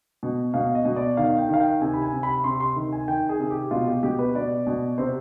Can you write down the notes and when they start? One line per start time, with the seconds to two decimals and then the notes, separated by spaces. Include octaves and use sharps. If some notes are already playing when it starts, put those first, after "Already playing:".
0.23 B2
0.54 B2 F5
0.75 D#5
0.85 B2
0.96 D5
1.17 D#3 F5
1.38 G5
1.49 D#3 F5
1.60 G5
1.81 C3 G#5
1.93 B5
2.02 G#5
2.13 C3
2.23 B5
2.44 C3 C6
2.60 C6
2.76 D#3
2.93 G#5
3.08 D#3 G5
3.29 G#4
3.40 C3
3.50 G4
3.71 B2 F4
3.87 G4
4.03 B2 G4
4.19 B4
4.35 B2 D5
4.67 B2
4.98 C3 C5